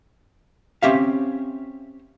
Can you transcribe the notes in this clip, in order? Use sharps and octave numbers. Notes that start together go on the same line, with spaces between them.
C4 C#4 G4 E5 F5